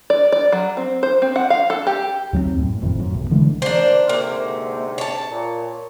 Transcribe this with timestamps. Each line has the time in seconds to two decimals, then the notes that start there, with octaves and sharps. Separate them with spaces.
0.10 D5
0.32 D5
0.52 F#3
0.77 C4
1.03 C5
1.22 C4
1.36 F#5
1.50 F5
1.70 A4
1.87 G4
2.33 D#2 F#3 A3 C4
2.58 F#2 A2
2.81 F1 F2 A2 D#3
2.99 F#2
3.15 B1
3.31 D3 E3 G#3 A3
3.62 G#2 A#3 D4 C5
4.09 D2 G#2 C3 A#3
4.98 C#5 A5
5.30 A#2